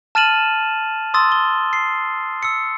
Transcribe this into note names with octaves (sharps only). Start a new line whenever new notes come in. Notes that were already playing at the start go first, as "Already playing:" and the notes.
A5 F6 A6 D#7 E7 F#7
C6 D#6 E6 A6
G7
C7
E6 C#7